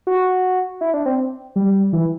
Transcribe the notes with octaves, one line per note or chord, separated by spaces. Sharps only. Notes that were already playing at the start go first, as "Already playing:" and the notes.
F#4
E4
D4
C4
G3
E3